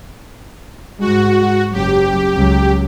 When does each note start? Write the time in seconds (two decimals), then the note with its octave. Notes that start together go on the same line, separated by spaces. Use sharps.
1.00 G#2 G#3 F#4
1.73 F#1 F#3 G4
2.36 C#2 F#3